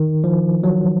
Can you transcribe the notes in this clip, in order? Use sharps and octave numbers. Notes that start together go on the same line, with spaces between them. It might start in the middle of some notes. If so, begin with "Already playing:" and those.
Already playing: D#3
F3
F#3